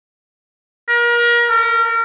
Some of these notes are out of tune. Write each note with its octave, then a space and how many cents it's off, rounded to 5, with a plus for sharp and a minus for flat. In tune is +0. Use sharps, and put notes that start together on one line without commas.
A#4 +35
A#4 -30